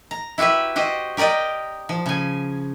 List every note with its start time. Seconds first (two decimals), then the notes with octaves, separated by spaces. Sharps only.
0.11 A#5
0.38 E4 F#4 G4 B4 E5
0.76 F#4 G4 C5 D#5
1.17 G4 A#4 D5 D#5 G5
1.89 F3
2.06 C#3 G#5